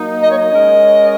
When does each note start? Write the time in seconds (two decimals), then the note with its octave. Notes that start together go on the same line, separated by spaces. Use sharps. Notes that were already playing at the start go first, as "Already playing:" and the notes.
Already playing: F#3 A#3 D#4
0.23 D#5
0.31 C#5
0.38 D#5
0.52 G#3 C#4 A#4 C#5